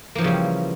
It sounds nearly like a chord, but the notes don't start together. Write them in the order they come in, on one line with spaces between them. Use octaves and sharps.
A#3 F3 E3 C#3 G3